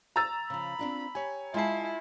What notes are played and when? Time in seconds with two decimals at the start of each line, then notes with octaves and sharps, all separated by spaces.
0.16 A#5 E6 A6
0.50 C#3 F3 B5
0.79 C4 D4 F4
1.15 G4 C#5 G#5
1.54 G#3 E4 F4 G#5 A5 C7